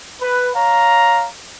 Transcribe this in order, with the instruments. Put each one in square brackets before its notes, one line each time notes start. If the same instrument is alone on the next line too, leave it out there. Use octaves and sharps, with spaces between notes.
[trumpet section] B4
C#5 F5 A#5